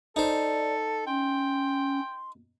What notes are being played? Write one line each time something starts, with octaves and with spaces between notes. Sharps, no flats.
D#4 A4 C5 D5
C#4 G5 C6